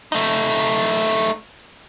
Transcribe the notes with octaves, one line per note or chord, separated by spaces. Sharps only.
A3 D#4